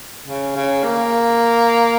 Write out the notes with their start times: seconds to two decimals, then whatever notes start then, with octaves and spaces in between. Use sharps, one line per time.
0.28 C#3
0.56 C#3
0.84 A#3